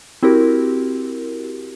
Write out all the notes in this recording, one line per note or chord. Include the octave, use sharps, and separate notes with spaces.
C4 E4 F#4 G4 A#4